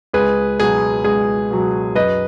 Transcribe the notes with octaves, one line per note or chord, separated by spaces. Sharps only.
C#2 G#4 B4
B2 F#3 G#4
C#2 G#4
B2 F#3
F#2 B4 D#5